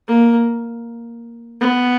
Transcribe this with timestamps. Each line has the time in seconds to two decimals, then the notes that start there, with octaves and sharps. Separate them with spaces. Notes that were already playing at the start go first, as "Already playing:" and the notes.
0.08 A#3
1.61 B3